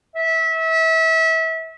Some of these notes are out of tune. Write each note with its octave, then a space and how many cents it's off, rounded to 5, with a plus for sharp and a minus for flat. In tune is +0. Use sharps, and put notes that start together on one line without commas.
E5 -25